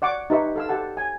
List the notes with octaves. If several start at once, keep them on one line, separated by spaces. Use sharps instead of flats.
D5 F#5 C#6 D6
D#4 G4 B4 E5 C#6
A4 F5 E6
G4 A4 F#5 A5
G#5